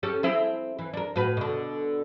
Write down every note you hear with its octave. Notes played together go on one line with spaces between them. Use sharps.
C#4 G4 A4
C4 E4 G#4
E3
D4 A#4
A2 F#4 B4
B2 D3